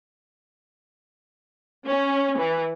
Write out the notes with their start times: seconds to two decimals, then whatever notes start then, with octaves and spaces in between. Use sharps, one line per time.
1.86 C#4
2.38 E3